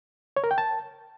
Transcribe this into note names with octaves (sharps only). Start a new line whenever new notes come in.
C#5
A#4
G5
A5